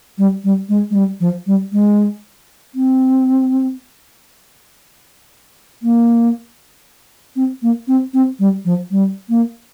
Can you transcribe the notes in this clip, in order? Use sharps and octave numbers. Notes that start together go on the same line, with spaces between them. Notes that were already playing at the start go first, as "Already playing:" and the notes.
G3
G3
G#3
G#3
G3
F3
G3
G#3
C4
A#3
C4
A#3
C4
C4
G3
F3
G3
A#3